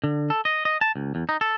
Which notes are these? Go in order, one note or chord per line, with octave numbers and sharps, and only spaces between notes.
D3
A4
D#5
D#5
A5
C#2
E2
D#4
A4